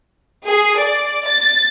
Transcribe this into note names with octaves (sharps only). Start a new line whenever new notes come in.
G#4
D5
A6